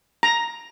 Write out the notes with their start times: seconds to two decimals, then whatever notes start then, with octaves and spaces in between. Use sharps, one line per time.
0.23 A#5